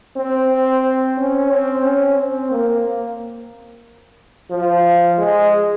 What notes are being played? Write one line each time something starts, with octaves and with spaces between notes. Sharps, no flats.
C4
C#4
C4
C#4
C4
A#3
F3
G#3